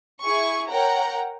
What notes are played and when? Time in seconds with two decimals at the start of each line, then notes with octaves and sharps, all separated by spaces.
0.22 E4 G#4 C#6
0.70 A#4 C#5 F#5 G5 A#5